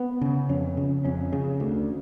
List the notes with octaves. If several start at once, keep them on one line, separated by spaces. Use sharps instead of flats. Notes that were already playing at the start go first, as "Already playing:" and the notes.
Already playing: B3
C#3
F2 C#4
C#3
F2 C#4
C#3
D2